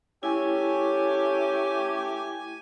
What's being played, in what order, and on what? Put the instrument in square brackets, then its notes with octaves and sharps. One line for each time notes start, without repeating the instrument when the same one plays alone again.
[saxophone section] A3 G4 [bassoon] C#4 [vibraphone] E4 [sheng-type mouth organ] G#5